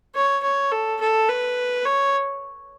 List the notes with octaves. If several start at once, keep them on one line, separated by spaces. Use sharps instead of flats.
C#5
C#5
A4
A4
B4
C#5